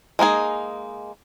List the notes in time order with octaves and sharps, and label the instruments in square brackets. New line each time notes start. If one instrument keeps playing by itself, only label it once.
[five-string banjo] G#3 A#3 D#4 G#4